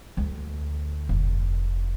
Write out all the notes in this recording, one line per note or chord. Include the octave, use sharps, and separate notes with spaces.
D2
F1